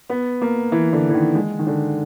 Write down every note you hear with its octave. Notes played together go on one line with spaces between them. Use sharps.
B3
A#3
E3
D3
E3
D#3
G#3
D#3
D3